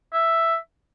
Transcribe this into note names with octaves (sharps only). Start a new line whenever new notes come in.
E5